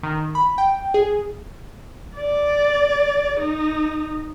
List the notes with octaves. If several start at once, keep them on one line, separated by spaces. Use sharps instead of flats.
D#3
B5
G5
G#4
D5
D#4